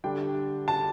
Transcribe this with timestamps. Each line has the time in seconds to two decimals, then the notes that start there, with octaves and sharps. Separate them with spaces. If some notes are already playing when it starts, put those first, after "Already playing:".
0.04 D3 G3 D4 G5
0.68 A5